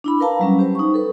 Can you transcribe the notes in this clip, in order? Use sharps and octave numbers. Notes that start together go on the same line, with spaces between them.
D4 E4 B5
A#4 B4 F5 A5 A#5
F#3 G3 C#4
G4 C5
D#4 C#6
A4 B4